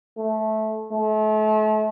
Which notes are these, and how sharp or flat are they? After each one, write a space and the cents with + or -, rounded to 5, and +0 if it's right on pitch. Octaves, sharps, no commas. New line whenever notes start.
A3 -15
A3 -35